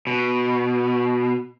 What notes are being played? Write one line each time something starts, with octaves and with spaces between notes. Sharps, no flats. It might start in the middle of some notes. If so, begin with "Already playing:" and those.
B2